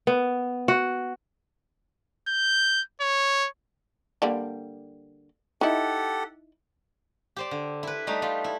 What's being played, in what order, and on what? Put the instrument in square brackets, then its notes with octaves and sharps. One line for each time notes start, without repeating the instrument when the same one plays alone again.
[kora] B3
F#4
[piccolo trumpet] G6
C#5
[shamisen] D3 G3 A#3
[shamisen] D#4 E4 [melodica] G4 A4 F#5
[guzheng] G4 C5 D5
D3
E4 B4
G3 A3 D#4
G3 F4
E4